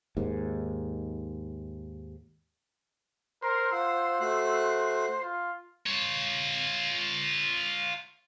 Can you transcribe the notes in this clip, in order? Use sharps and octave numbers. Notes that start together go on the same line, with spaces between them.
D#2 G#2
A#4 C5
F4 F#5 E6
A3 F#4 F#6
F4
F4 C#5